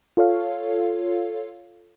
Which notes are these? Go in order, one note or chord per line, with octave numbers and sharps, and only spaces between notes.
F4 A4 C#5 F5